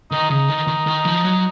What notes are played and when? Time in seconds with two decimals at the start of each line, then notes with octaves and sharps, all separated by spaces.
0.11 D#3 D#4
0.30 C#3 D#4
0.49 D#3
0.67 D#3
0.86 D#3
1.05 F3
1.24 F#3